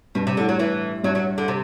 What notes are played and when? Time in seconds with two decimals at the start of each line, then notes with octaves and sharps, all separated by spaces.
0.15 G2 B2
0.27 C3
0.37 A2 D3
0.49 F#3
0.60 E3
1.03 G2 F#3
1.15 F#3
1.38 D3
1.48 C3